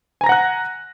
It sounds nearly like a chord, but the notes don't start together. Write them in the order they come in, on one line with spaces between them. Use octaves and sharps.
G#5 A#5 A#6 F#5 F#6